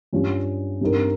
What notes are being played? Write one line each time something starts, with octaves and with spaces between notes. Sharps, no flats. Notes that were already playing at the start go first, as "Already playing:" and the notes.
G2 G3 C#4 F4
G2 G3 C4 D#4 A#4